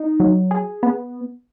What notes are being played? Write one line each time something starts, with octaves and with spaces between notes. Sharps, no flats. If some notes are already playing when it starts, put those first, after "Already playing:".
Already playing: D#4
F#3
G#4
B3